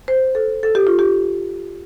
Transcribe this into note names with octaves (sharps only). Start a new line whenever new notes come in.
C5
A4
A4
G4
F4
G4